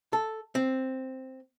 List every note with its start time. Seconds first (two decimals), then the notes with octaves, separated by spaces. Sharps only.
0.13 A4
0.55 C4